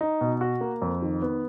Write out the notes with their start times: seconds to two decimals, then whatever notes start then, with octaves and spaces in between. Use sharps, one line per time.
0.01 D#4
0.21 B2
0.41 F#4
0.61 A#3
0.82 F2
1.02 D#3
1.22 B3